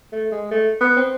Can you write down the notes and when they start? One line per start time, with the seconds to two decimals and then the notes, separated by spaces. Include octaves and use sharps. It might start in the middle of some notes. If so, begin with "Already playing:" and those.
0.12 A3
0.31 G#3
0.51 A3
0.81 B3
0.97 C4